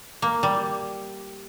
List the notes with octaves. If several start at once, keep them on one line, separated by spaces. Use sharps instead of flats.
A#3
G3